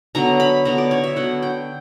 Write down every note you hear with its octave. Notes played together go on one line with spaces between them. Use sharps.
D3 F#3 B3 A#5
B5
D3 F#3 B3 A#5
D5
C#5
E5
D3 F#3 B3 F#5
G5